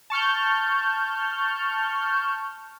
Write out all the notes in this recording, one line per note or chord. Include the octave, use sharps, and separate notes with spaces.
A5 C#6 F6 G6